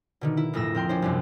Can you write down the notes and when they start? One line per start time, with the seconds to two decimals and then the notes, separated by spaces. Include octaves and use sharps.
0.21 B2 D3 D#3
0.37 E4
0.53 A#1 F2 A2 A3 E6 A#6
0.75 C4 A#4 G5 C6
0.89 C#4 D4 E4 C5
1.02 C2 F#2 C3